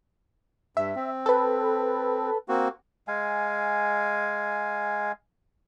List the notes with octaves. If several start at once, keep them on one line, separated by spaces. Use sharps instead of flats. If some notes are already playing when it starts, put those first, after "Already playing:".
G2 E5
C4
A4 B4
A#3 C4 F#4
G#3 F5 G#5